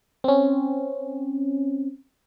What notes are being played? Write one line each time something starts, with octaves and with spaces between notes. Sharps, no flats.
C4 C#4